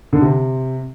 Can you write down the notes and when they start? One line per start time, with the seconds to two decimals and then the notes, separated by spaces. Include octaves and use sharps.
0.13 D3
0.21 C3